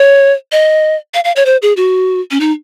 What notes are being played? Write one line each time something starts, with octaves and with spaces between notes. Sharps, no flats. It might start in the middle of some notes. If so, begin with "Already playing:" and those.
Already playing: C#5
D#5
F5
F5
C#5
C5
G#4
F#4
C#4
D#4